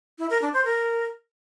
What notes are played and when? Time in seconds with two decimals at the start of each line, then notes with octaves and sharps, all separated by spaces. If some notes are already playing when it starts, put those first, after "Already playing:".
0.18 E4
0.30 A#4
0.42 D4
0.53 C5
0.65 A#4